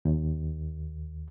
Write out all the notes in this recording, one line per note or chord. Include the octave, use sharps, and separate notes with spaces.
D#2